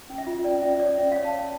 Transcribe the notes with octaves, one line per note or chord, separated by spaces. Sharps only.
C#4
E5
F4
C#4 D5
C#4 E5
C#5 D5
C#4 E5
F5
C#5
A5
C#5